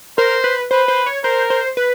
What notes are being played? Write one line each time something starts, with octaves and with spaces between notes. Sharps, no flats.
A#4 C5
B4
B4 C5
C5
C#5
A#4 C5
C5
B4